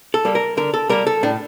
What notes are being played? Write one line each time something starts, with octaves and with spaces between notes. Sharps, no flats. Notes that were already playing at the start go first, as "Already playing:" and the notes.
A4
G3 A#3
A#4
D3 A#4
A4
G3 A#3 A#4
A4
A2 D4